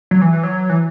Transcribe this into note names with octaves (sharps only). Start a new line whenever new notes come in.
F#3
E3
E3
F#3
E3